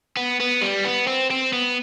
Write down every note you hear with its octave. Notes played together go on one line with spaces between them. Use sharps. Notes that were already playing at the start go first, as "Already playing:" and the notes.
B3
B3
G3
B3
C4
C4
B3